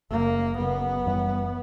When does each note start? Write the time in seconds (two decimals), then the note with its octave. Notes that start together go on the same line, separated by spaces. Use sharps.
0.10 F#1 F#2 C#3 A#3
0.58 F#1 F#2 C#3 B3
1.06 F#1 F#2 E3 G3